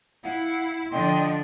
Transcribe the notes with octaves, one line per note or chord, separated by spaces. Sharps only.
E4 F5 F#5
D3 F3 D4 D#5 G5 C6